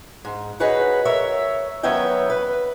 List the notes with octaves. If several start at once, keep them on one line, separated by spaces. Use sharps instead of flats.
G#2
D#4 F#4 G#4 B4 C#5 F#5
A#4 C#5 E5
D#3 F#3 B3 C#4 E5 G5
B4